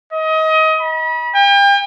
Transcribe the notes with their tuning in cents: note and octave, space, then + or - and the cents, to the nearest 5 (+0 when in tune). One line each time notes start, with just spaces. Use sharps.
D#5 +25
B5 -35
G5 +40